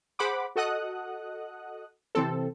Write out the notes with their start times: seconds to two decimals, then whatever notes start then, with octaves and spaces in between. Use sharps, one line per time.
0.19 G#4 C5 F#5 B5 D6
0.56 F#4 A4 D#5 F#5 D#6 F#6
2.15 C3 E3 C4 A4